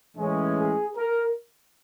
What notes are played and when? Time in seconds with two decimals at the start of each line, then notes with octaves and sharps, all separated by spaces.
0.16 A2 E3 G#3 C#4
0.57 G#4
0.96 A#4